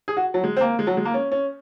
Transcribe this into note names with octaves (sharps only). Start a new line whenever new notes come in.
G#4
F#4
F#3
G#3
C4
A#3
G#3
F#3
G#3
A#3
C#4
C#4